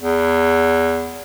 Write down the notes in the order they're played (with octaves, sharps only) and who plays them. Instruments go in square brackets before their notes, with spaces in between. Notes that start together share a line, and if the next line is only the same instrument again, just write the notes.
[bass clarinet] E2